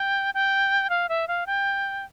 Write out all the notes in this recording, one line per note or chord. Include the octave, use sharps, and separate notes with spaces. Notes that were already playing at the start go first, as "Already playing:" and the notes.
Already playing: G5
G5
F5
E5
F5
G5